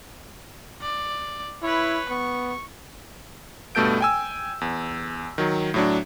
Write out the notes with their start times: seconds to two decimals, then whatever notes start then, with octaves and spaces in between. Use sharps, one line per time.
0.81 D5
1.63 E4 B4 C#5
2.10 B3 C#6
3.75 G2 B2 A3 A4 G6 D7
4.01 G5 G#5 E6
4.61 E2
5.38 D#3 F#3
5.74 A2 F#3 D4